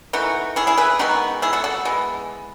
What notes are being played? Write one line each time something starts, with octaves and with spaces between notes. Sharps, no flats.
E3 A3 D#4 F#4
E4 G#4
E4 G#4
G#4 B4
D#3 G#3 B3 D#4 F#4
E4 G#4
F#4 A4
F#4 A4
E3 G#3 B3